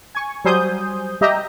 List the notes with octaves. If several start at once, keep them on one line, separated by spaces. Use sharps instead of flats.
G#5 C#6
F#3 G3 C5 G#5 D#6 G6
G3 G4 D#5 E5 A#5 G6